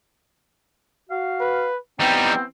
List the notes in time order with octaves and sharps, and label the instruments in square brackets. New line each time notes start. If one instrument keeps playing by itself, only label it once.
[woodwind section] F#4 F5
[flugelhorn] B4
[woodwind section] E3 B3 C4 [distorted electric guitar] G3 D#4 [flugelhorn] G5